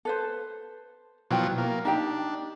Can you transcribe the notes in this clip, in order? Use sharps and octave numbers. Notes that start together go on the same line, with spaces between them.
A4 B4 C5
B2 F3 F#3 E4 G5
A#3
D4 D#4 G4 G5